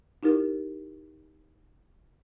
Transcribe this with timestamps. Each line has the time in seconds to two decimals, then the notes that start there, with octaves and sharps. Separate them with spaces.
0.23 D#4 E4 G4 A#4